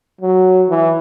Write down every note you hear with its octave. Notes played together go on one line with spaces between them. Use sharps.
F#3
E3